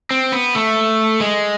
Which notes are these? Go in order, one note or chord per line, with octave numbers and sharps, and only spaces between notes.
C4
B3
A3
G#3